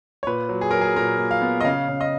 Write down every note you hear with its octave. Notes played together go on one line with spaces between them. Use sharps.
C#5
A#2 B4
F#3
G#4
F#3 A#4
G#4
A#2 A#4
A#2
F5
B3
D#5
C#3 F5
C#3
D#5